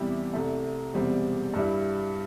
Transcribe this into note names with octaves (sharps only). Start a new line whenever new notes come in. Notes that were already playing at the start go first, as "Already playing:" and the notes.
Already playing: E2 C3 G3 E4 G4
C2 C3 A3
E1 E2 C3 G3 C4
G2 G3 E4